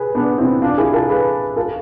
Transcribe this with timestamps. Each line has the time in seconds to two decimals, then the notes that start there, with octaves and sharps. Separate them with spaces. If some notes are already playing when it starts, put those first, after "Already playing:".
Already playing: G#4 B4
0.15 B3 D4
0.38 C4 E4
0.62 D4 F4
0.78 E4 G#4
0.93 F4 A4
1.09 G#4 B4
1.56 F4 A4